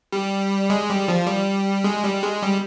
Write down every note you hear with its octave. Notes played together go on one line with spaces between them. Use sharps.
G3
G#3
G3
F3
G3
G#3
G3
G#3
G3